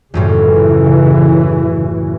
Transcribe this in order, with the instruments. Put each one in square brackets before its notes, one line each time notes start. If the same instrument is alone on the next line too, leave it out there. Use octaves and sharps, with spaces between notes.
[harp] D#1 F#2 A2 [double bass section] C#3 E3